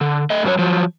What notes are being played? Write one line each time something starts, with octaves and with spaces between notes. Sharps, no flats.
D3
A3 D#5
G2 F#3 G4 C#5
F3 F#3